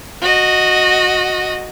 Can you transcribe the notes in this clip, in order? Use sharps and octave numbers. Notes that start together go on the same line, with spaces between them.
F#4 D#5